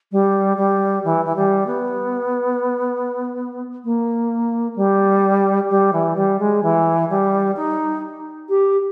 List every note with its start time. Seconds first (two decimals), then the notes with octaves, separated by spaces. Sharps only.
0.12 G3
0.57 G3
1.04 E3
1.25 E3
1.36 G3
1.67 B3
3.84 A#3
4.76 G3
5.70 G3
5.93 E3
6.16 G3
6.40 G#3
6.63 E3
7.10 G3
7.57 D#4
8.49 G4